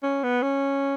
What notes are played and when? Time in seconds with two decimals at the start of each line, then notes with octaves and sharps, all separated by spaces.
0.03 C#4
0.24 B3
0.43 C#4